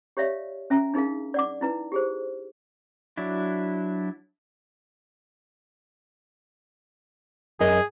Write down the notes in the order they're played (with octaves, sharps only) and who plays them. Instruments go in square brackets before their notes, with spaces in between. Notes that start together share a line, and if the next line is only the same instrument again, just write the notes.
[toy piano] G4 C#5 D5 E5 F5
C#4 E5 G#5 A#5
D4 D#4 G#4 A#4 F5
D5 F#5 D6
D#4 E4 B4
G4 G#4 C5
[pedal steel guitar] F#3 D4 E4
[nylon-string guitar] F#2 A#4 D#5 [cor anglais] G#4